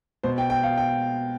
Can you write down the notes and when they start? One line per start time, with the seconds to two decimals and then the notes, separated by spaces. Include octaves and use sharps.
0.23 B2 C5
0.38 G5
0.50 G5
0.63 F5
0.77 G5